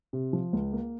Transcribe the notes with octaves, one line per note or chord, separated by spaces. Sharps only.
C3
F3
C#2
A#3